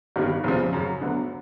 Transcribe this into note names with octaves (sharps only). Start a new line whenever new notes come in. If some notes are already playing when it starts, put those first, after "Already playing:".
G1 G2 D#3 G3 A#3
F1 E2 C#3 F3
F#2 C#3 F#3
D2 D3 F#3 B3